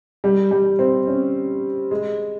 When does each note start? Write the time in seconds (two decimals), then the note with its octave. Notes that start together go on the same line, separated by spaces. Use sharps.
0.24 G3
0.51 G3
0.79 C4
1.07 C#4
1.91 G#3